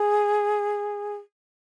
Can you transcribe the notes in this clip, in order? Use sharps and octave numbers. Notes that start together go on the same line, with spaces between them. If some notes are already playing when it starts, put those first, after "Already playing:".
Already playing: G#4